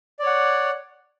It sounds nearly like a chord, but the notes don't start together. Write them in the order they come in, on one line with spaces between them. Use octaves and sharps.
D5 C#5 F#5